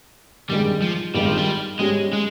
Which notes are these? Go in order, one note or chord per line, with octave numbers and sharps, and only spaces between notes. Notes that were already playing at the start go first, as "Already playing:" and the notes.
G#1 G2 D#3 G3 G#3
F3
G#1 G2 D#3 G3 G#3
F3
G3
G#2 G3 G#3 C#4
G#3